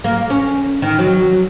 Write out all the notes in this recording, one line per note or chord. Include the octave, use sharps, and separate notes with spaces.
A#3
C#4
D#3
F#3